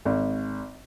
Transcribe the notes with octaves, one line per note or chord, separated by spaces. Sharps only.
G#1